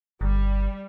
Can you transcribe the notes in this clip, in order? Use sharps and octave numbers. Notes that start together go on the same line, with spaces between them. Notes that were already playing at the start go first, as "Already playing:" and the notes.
G1 G3